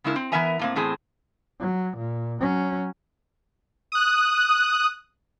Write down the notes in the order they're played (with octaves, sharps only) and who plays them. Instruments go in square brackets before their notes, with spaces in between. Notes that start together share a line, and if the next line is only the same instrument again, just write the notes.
[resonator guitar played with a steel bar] C#3 G#3 E4 A#4
C4
E3 B3 A#4 E5 G#5 A#5
A2 A#3 C4
E2 A2 C4 G#4
[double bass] F#3
A#2
F#3 C#4
[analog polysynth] D#6 F#6